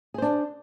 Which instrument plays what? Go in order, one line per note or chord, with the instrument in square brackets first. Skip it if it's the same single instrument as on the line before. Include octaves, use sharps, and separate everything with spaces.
[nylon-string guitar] G#4
C5
D4